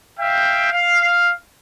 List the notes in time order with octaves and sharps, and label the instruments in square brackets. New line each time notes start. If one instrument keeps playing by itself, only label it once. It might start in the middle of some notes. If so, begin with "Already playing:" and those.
[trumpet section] E5 F5 G5
F5